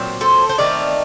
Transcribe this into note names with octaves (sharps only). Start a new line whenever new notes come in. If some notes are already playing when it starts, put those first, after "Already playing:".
Already playing: A#2 F#3 C4
A4 C5
C5
D#3 A3 C4 A#4 D5